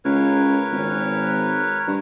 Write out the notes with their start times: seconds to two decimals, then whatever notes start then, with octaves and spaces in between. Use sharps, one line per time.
0.05 C#2 A#4 B4 C#5
0.72 G#1
1.87 G2